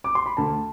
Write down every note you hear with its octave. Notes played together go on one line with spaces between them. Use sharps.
D6
C6
B5
D2 A5